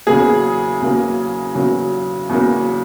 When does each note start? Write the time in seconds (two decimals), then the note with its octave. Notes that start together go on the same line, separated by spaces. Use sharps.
0.07 E2 C#3 F#3 A#3 G#4
0.81 E2 C#3 F#3 A#3
1.55 E2 C#3 F#3 A#3
2.29 E2 C#3 F#3 A#3